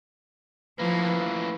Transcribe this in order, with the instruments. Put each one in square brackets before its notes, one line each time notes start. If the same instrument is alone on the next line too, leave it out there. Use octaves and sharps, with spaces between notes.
[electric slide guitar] A2 E3 A#3 [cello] F3 [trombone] B4